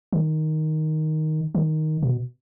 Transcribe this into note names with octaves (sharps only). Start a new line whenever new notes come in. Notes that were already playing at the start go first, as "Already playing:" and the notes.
D#3
D#3
B2